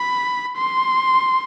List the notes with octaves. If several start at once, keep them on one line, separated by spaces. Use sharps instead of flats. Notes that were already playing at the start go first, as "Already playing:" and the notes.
Already playing: B5
C6